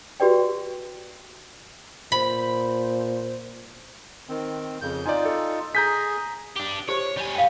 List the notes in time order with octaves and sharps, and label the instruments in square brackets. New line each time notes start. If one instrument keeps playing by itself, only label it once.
[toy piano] F#4 G4 B4 D5 G5
[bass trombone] A#2 [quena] C5 [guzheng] B5
[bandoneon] D#3 C4
F2 C#3 G6
[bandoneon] D#4 F4 [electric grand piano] D5 G#5
[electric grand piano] A4
[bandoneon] G#4 G#5 [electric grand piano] A#5 G6 B6
[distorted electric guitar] D4 G4
[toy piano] G4 C5 [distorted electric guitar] C#5
[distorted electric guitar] G3 G#5
[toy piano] F5 G5